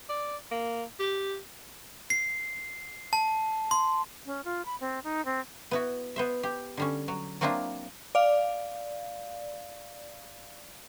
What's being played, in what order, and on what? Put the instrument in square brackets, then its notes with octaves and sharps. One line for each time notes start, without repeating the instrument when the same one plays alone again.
[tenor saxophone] D5
A#3
G4
[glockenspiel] C7
A5
C6
[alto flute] C#4
F4
B5
C4
D#4
C4
[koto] B3 E4 F#4
B3 C5 E5
G4
D3 G3 C#4
F#3
F#3 A#3 C4 D4 E4 F4
[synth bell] D5 F5